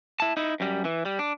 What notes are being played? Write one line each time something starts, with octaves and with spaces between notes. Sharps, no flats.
E4 A5
D#4 E4
F#2 G3
E3
G3
D4